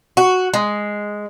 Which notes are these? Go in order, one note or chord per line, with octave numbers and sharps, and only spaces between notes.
F#4
G#3